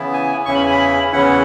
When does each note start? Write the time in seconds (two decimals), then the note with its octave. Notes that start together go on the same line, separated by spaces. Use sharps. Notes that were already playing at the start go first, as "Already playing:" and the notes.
Already playing: C#3 E3 B3 E4
0.13 G#5
0.46 E2 C#3 E3 C#4 E4 C#6
0.55 B5
0.63 G#5
0.71 B5
1.13 E2 C#3 E3 C#4 E4 F#5